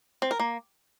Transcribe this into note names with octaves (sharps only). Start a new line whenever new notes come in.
C4
A#4
A#3